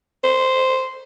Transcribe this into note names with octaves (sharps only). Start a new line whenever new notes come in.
C5